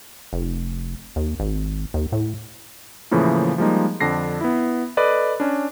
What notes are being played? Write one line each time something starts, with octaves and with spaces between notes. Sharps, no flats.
F1
D#2
G#1
D#2
A2
A2 C#3 E3 F3 A#3
F3 G3 G#3 A#3 D#4
F2 D3 D4 A#6 C7
B3 E4
A4 B4 D5 D#5
C#4 D4